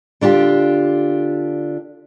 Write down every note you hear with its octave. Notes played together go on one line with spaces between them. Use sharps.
D3 D4 F4 G4